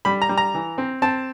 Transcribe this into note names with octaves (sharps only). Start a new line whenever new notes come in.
G3 B5
A#5
G3
A#5
E3
C4
C4 A5